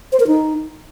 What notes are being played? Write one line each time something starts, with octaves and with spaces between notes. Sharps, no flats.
C5
A#4
D#4